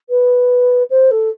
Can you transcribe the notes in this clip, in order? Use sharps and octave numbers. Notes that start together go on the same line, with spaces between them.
B4
C5
A4